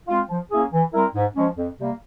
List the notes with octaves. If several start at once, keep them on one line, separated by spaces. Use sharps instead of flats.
G#3 C4 F4
F3
A#3 C#4 E4 G#4
E3
G3 C4 E4 A#4
G#2
F3 G#3 C#4
F2
C3 G3 A#3